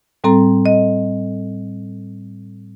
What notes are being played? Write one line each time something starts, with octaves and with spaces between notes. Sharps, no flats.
A2 G3 C4 A4 A#5
D#5